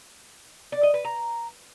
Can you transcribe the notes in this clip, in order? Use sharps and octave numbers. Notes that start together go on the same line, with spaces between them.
D5
D#5
B4
A#5